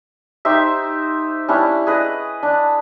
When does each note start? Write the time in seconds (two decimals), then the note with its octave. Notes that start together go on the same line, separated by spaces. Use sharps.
0.45 D#4 G4 C5 E5
1.48 G3 C#4 D4 E4
1.87 G#4 B4 D#5
2.43 D4